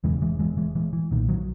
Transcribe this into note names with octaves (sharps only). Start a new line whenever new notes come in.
E1 E2 C#3 E3 G#3
E3 G#3
E3 G#3
E3 G#3
E3 G#3
E3
B1 A#2 D#3
D#3 F#3